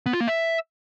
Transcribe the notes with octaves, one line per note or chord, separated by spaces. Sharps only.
B3
F4
A#3
E5